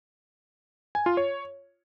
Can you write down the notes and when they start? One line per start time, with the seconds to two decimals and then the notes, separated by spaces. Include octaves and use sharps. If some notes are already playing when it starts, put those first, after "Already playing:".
0.95 G#5
1.06 F4
1.17 C#5